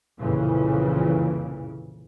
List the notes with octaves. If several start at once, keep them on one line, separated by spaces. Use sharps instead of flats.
C2 F2 A#2 C#3 E3